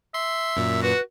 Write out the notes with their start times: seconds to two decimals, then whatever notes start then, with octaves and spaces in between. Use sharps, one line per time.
0.14 E5 C6
0.56 F#2 A#2
0.83 F#4 B4